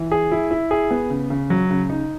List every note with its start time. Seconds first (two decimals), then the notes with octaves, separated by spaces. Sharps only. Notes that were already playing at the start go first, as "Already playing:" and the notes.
Already playing: E3
0.11 G#4
0.32 E4
0.51 E4
0.71 G#4
0.91 B3
1.10 C#3
1.30 C#3
1.50 F#3
1.70 C#3
1.90 D#4